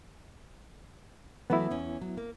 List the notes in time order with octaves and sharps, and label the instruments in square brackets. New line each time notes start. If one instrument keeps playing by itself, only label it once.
[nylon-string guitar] E3 F#3 A3 [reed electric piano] B3 E4
[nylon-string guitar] E2 C#4
F#3
A#3